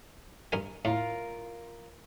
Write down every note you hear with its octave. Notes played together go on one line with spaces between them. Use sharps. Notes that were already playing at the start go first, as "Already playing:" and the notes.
G2 A#4 G#5
A2 F4 A#4